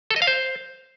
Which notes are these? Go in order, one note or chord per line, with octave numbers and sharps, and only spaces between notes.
A4
D#5
F5
C5